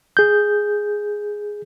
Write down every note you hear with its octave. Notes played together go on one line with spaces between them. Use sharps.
G#4 G6